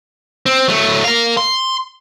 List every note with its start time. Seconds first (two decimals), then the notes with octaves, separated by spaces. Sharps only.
0.46 C4
0.68 F#3 A3
1.04 A#4 F5
1.37 C6